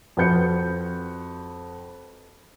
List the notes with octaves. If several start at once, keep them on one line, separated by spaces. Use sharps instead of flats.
F2 F#4 B4 G6 C#7